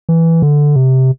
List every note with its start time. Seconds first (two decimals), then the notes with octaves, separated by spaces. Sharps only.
0.09 E3
0.42 D3
0.76 C3